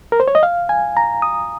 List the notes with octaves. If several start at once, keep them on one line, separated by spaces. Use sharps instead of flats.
A#4
C5
C#5
D#5
F5
G#5
A#5
D#6